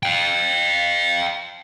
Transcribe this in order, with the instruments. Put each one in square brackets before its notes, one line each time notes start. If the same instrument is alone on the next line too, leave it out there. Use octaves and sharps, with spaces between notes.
[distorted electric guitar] F5 G5